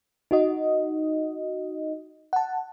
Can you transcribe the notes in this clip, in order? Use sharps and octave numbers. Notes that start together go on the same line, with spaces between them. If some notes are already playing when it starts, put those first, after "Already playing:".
D#4 F#4 D#5
F#5 A5